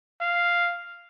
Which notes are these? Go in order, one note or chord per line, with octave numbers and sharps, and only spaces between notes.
F5